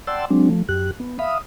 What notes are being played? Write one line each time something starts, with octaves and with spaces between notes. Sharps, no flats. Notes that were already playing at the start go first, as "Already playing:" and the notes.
D5 F#5 G5 A5 C6 E6
F#3 G#3 C4 D4
F3 A3
F#2 G4 F#6
B3
E5 F5 B5 D#6